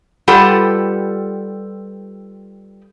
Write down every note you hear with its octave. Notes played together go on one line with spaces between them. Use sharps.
G3 F4 G4 A4 B4 F#5